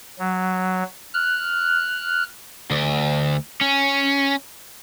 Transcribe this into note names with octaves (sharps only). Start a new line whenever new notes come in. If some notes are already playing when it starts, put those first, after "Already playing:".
F#3
F6 F#6
D2
C#4